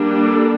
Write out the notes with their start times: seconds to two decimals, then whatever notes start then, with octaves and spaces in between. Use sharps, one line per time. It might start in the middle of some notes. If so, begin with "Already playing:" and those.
Already playing: G3 A#3 D4
0.23 A4